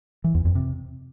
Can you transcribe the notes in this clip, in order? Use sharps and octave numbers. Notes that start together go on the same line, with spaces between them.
E3
E2
F2
C3